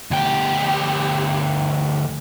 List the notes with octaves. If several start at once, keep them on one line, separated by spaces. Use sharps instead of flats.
D2 G4